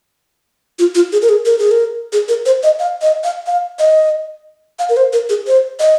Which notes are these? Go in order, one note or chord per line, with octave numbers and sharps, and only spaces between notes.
F4
F4
G#4
A#4
G#4
A#4
G#4
A#4
G#4
A#4
C5
D#5
F5
D#5
F5
F5
D#5
F5
A#4
C5
A#4
G#4
C5
D#5